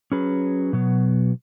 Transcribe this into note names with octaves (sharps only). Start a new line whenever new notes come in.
F#3 C#4 G#4 B4
B2 F#3 B3